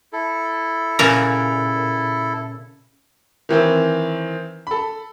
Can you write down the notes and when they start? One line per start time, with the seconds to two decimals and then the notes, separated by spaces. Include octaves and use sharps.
0.13 E4 A4
0.99 A#2 C#3 A#4
3.49 D#3 E3 C4
4.67 A4 B5